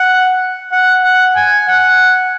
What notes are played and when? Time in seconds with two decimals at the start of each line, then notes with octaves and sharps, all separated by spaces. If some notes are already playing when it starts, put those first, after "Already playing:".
Already playing: F#5
0.72 F#5
1.04 F#5
1.36 G#5
1.68 F#5